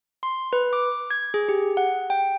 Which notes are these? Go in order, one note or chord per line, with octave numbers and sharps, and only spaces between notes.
C6
B4
D6
G#6
G#4
G4
F#5
G5